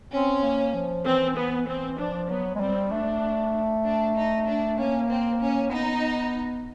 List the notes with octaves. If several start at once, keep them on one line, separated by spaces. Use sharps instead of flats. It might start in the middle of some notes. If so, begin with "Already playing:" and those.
C4 C#4
A#3
F3
E3 C4
B3
C4
F3 D4
F#3 B3
G#3
G3 C4
A3 D4
D4
D#4
D4
A#3 C#4
C4
C#4
B3 D#4